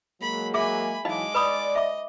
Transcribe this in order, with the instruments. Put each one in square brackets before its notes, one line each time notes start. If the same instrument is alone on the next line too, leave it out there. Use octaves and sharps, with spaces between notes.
[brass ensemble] F#3 G#3 A#3 [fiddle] B5
[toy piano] G#4 E5 D6 [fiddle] G#5 B5
[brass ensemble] E3 F#3 [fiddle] G#3 D6 [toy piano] D#4 D#5 F5
[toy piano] B4 B5 D#6 [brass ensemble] D5
[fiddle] D#5 [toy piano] E5 D6